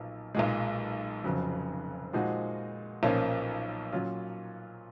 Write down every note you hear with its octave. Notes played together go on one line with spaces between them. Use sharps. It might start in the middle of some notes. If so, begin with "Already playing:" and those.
Already playing: B1 A#2 F3
B1 A#2 G#3
F1 F2 C#3 F#3
A#2 F3 G#3 D#4 F#4
B1 A#2 F3 A#3 C#4
A#2 F#3 C#4 F4